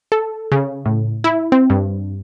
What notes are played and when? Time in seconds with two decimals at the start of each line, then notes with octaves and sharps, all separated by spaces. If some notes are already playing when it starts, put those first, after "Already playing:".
0.12 A4
0.52 C#3
0.86 A2
1.24 E4
1.52 C4
1.70 G2